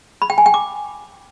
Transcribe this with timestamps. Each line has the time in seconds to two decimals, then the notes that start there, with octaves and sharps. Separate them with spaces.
0.22 B5
0.30 G5
0.38 G#5
0.46 G5
0.54 D6